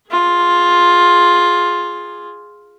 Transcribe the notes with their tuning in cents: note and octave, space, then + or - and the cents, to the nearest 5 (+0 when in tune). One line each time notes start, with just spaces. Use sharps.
F4 +5 G#4 +0